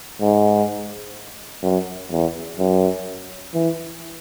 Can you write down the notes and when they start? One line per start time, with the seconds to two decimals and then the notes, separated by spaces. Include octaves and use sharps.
0.21 G#2
1.63 F#2
2.11 E2
2.59 F#2
3.54 E3